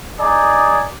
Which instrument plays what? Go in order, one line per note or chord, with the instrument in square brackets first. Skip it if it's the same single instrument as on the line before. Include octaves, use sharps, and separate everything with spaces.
[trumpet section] D#4 G#4 D5